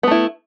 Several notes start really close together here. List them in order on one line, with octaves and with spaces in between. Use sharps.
B3 A3 E4